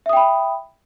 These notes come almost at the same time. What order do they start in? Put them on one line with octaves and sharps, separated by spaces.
E5 D#6 G5 B5